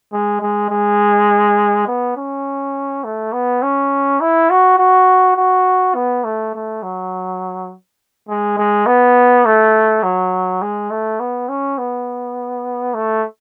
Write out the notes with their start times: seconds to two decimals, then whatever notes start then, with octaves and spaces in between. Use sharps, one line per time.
0.13 G#3
0.41 G#3
0.70 G#3
1.88 B3
2.17 C#4
3.04 A3
3.33 B3
3.62 C#4
4.21 E4
4.50 F#4
4.78 F#4
5.37 F#4
5.95 B3
6.24 A3
6.54 A3
6.83 F#3
8.29 G#3
8.58 G#3
8.87 B3
9.46 A3
10.03 F#3
10.62 G#3
10.91 A3
11.20 B3
11.49 C#4
11.78 B3
12.94 A3